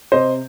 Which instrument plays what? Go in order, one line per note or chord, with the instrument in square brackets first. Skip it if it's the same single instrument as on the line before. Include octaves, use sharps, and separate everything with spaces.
[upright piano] C3 C5 D#5